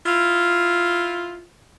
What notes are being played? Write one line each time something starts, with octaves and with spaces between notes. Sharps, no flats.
E4 F4